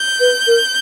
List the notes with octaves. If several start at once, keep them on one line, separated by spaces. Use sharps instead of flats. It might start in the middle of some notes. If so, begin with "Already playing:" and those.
Already playing: G6
B4
A#4